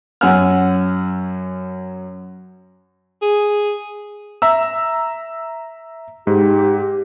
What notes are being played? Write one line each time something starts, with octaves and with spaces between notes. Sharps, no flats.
F#2 C#4 F#5 G#5 E6 F6
G#4
E5 A#5 E6
G#2 G4